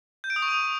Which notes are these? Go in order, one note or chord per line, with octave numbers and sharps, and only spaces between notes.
G6
D7
D#6
C#6
D#6